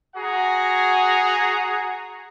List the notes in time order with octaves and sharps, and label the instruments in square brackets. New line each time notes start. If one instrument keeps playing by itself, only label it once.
[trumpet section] F#4 G#4 F#5 A#5